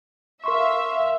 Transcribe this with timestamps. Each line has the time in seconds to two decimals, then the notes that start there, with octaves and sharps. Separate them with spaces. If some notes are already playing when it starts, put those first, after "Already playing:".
0.44 A#4 E5 F5 C6 C#6